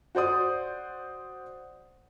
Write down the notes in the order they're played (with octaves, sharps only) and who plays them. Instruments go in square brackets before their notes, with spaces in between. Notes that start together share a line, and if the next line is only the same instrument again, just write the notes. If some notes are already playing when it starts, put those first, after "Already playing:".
[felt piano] F#4 C5 D5 D#6